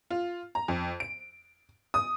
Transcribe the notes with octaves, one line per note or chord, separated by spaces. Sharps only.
F4
A#5
F2
D7
D#6